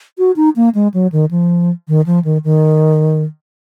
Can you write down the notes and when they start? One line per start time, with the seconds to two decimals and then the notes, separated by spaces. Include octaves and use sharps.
0.18 F#4
0.36 D#4
0.56 A#3
0.75 G#3
0.94 F#3
1.12 D#3
1.31 F3
1.88 D#3
2.06 F3
2.25 D#3
2.44 D#3